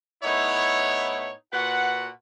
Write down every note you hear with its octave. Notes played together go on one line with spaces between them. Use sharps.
A2 B3 D#4 E4 C#5
A#2 F#4 B4 F#5